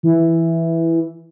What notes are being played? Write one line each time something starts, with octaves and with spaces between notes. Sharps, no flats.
E3